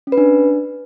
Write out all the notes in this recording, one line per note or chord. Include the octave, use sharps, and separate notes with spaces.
C#4
B4
D4